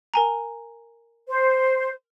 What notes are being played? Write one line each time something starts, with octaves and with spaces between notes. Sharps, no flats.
A#4 G#5 A#5
C5